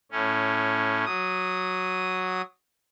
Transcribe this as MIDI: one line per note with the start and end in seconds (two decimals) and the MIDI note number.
0.11 1.05 45
0.11 1.05 61
1.05 2.42 54
1.05 2.42 87